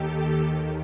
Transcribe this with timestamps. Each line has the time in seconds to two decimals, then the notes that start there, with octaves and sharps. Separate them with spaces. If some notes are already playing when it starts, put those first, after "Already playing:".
Already playing: D#2 D#3 G4 A4
0.40 D#2 D#3